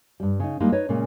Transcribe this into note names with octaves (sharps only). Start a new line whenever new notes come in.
G2 G3
C#3 D#4
G3 G#3 A#3 D#4
D#4 B4 C#5 D#5
A#2 C#3 G#3 C#4